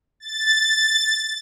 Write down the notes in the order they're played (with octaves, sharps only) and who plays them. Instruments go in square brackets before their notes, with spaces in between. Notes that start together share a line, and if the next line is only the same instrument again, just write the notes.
[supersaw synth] A6